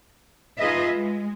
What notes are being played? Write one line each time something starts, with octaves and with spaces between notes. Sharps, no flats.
D#4 F4 G#4 B4 D#5 E5
G#3